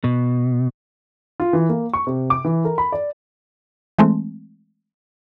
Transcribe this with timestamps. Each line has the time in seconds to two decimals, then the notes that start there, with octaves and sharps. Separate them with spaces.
0.04 B2
1.40 F4
1.53 E3
1.69 A#3
1.93 C#6
2.07 C3
2.30 D6
2.44 E3
2.65 A#4
2.78 B5
2.92 D5
3.98 E3 G#3 A3 C4